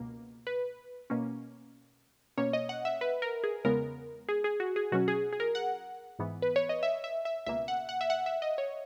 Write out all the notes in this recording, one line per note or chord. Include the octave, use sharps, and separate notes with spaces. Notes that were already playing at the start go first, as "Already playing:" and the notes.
Already playing: C#2 B2 A#3
B4
B2 A#3 C#4
B2 A#3 C#4 C#5
D#5
F#5
E5
B4
A#4
G#4
E2 C#3 G#3 B3 A#4
G#4
G#4
F#4
G#4
B2 F#3 C#4 F#4
G#4
G#4
A#4
F#5
G#2 E3 B3
B4
C#5
D#5
E5
E5
E5
C#2 B2 A#3 E5
F#5
F#5
E5
F#5
E5
D#5
C#5